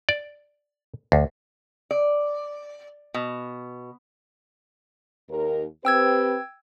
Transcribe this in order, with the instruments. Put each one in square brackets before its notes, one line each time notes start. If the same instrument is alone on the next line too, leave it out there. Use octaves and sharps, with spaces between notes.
[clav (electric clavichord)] D5
D2
[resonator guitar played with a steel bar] D5
B2
[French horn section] D#2 A#4
[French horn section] C4 G4 B4 [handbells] G5 E6 G#6